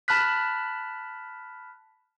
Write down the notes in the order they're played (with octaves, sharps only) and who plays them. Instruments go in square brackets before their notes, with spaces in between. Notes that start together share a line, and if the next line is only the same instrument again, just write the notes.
[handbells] A5 B5 F6 F#6 B6